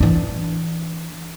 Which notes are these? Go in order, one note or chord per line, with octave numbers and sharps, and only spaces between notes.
E3 D4